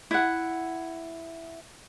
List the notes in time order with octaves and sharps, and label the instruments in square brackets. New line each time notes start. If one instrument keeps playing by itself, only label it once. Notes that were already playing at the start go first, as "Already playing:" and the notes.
[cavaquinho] E4 F#5